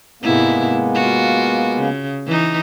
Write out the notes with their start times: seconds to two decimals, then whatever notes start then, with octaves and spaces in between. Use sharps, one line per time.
0.22 G#2 C3 G#3 A#3 B3 E4
0.94 F4 F#4
1.77 C#3
2.27 E3 D#4